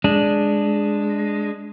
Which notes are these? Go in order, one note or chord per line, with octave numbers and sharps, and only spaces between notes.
G#3 D4